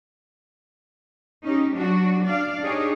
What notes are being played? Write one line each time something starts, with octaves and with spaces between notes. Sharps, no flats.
C#4 D#4 G4
F#3 D4 F#4
D4 D5 F5
D4 D#4 G4 G#4 C#5